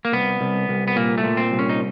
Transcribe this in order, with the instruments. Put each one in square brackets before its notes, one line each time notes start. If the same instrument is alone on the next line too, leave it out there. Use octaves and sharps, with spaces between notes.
[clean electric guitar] A#3
C2 B3
C2
C2
B3
A#2 A#3
A3
A#2
C4
C2
C#4
D#4